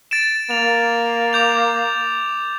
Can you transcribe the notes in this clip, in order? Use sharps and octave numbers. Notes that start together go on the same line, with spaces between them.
A6 D7 E7
A#3 F7
D6 G6 F7